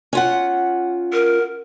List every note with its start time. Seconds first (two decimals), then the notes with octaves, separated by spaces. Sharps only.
0.13 C#4 F4 F#5
1.13 A#4